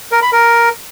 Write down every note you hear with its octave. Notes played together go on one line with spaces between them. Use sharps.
A#4
B5
A#4